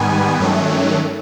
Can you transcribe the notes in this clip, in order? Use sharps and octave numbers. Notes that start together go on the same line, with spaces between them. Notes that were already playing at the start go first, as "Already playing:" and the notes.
Already playing: G#2 D#3 G3 B3 G#5
G2 D#3 F#3 A3 C#4